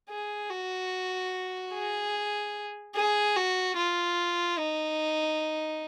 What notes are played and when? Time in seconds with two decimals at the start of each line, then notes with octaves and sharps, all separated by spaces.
0.09 G#4
0.50 F#4
1.73 G#4
2.95 G#4
3.36 F#4
3.77 F4
4.58 D#4